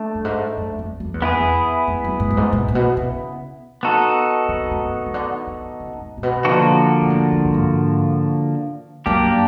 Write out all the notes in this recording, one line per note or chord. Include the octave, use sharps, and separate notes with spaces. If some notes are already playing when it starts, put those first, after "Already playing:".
Already playing: A3 D4
G2
G#2
F#2
F2
F2
E2
B3 E4 G#4
E2
F2
F#2
G#2
G2
G#2
A#2
A#2
B2
C#3
B3 D#4 F#4 A4
D3
D3
C#3
C#3
D3
D3
C#3
C3
A#2
B2
D3 F3 A#3 D4 F#4
A#2
A2
G#2
G2
G#2
F#2 A#3 D4 G4